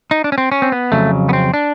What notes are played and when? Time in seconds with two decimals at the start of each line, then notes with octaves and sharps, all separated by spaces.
0.11 D#4
0.24 D4
0.32 C#4
0.38 C4
0.52 C#4
0.62 C4
0.72 B3
0.92 F2 C#3 F#3 A3
1.29 B3
1.33 C4
1.54 D4